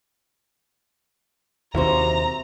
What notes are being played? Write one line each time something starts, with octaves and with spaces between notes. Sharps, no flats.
D#2 C3 E4 F#4 C5 A#5